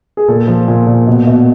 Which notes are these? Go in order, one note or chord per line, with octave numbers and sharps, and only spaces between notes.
G#4
A#2 A4
F3
A#2
A#2
B2
B2